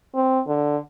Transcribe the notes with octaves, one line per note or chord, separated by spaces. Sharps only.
C4
D3